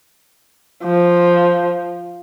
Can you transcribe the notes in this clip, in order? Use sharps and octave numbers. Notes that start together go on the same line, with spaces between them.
F3